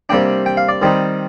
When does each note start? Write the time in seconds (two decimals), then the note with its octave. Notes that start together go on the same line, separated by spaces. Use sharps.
0.09 C3 G3 A#3 D4 G5
0.46 G5
0.57 F5
0.69 D5
0.82 D#3 G3 C4 D#4